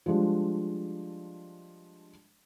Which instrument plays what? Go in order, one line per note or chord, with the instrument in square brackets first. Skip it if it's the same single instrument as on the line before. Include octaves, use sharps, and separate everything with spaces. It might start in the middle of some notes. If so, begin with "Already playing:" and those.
[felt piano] F3 G3 G#3 D4